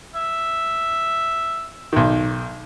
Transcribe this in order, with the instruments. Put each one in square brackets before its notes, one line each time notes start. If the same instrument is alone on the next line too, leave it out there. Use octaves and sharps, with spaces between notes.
[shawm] E5
[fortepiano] B1 D#3